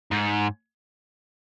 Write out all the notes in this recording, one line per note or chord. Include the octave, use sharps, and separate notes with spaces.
G#2